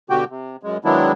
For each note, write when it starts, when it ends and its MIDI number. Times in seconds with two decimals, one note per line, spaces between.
0.10 0.24 47
0.10 0.24 50
0.10 0.24 66
0.10 0.24 67
0.10 0.24 79
0.30 0.57 48
0.63 0.77 42
0.63 0.77 56
0.85 1.12 51
0.85 1.12 54
0.85 1.12 56
0.85 1.12 59
0.85 1.12 62
0.85 1.12 64